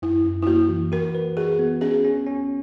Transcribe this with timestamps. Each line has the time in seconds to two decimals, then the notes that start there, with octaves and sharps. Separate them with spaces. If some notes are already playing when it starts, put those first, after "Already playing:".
0.02 F#2 E4
0.25 F#2
0.42 E4
0.47 A#3 F#4
0.70 E3
0.92 F#4 A#4
1.15 B4
1.37 F#4 G#4
1.59 B3
1.81 C#4 G#4
2.04 C#4
2.26 C#4